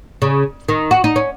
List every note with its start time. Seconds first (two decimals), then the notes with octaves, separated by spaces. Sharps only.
0.22 C#3
0.68 D#3
0.91 F#4
1.04 D#4
1.16 C#4